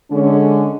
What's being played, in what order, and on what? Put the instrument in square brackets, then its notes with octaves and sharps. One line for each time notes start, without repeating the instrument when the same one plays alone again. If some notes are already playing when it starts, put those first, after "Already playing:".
[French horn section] D3 G#3 C#4